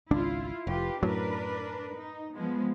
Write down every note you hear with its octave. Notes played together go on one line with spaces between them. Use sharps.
G#1 C#2 D4 E4 F4
F1 F4 G4 B4
F#2 A2 F#3 D4 A#4 B4
D#4
F3 G#3 B3